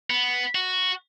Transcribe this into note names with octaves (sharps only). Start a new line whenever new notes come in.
B3
F#4